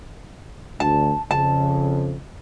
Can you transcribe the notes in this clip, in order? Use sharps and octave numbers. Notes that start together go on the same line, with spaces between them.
D2 A5
F2 C#3 A5